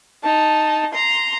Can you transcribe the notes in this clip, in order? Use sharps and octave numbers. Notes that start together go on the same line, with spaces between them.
D#4 A5
A#5 C6